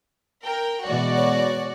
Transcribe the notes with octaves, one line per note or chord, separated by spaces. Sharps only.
A#4 G5
B2 E3 G#3 F#4 D5
C#5